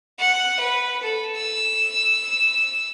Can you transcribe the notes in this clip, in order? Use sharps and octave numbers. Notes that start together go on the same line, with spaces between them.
F#5
B4
A4
E6